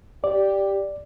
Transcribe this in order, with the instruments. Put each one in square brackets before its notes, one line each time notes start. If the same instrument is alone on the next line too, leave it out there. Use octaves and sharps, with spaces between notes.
[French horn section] G4 [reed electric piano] D5